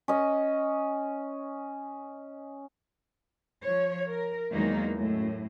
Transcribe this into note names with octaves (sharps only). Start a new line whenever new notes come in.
C#4 D#5
F3 C#5
A#4
E2 D#3 F#3 G#3 A#3 D#4
F#2 A2